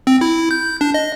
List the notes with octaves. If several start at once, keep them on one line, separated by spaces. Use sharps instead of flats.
C4
E4
G6
D4
D#5